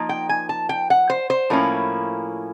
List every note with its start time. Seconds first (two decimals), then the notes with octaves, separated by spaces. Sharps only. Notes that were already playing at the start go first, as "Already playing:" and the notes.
Already playing: F3 A#3 D#4
0.09 G5
0.29 G#5
0.49 A5
0.69 G5
0.90 F#5
1.10 C5
1.30 C5
1.50 A2 F3 A#3 C#4 E4